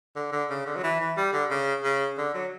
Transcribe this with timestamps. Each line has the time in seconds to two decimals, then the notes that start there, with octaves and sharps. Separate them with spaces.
0.16 D3
0.32 D3
0.50 C#3
0.66 D3
0.76 F#3
0.83 E3
1.00 E3
1.17 G3
1.33 D3
1.50 C#3
1.83 C#3
2.18 D3
2.34 F#3